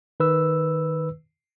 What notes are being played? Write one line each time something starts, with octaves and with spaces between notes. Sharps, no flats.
D#3 B4 E6